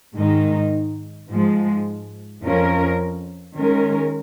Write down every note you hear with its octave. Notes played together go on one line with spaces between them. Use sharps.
G#2 D#3 G#3 D#4
G#2 F3 G#3
F2 F3 C#4 A#4
D#3 G#3 C#4 A#4